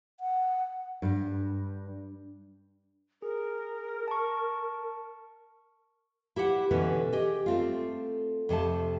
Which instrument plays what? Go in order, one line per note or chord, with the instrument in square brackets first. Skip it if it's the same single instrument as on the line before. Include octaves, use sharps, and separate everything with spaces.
[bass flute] F#5
[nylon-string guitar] G2
[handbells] G#4 [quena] A#4
[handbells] A5 C#6
[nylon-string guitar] E4 G4 C5 F#5
B2 D3 E3 B3 C#4
G4 G#4 D#5
A3 C4 F4
F2 C3 A3 A5